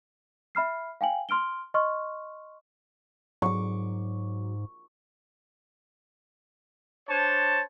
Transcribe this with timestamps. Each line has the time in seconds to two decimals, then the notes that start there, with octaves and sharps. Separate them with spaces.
0.55 E5 B5 F6 C7
1.01 F5 G5 G#5 F#7
1.29 C6 F6 D7 G7
1.74 D#5 C6 C#6 F6
3.42 G#2 F#3 C#6 D6
7.09 D4 C5 C#5 A5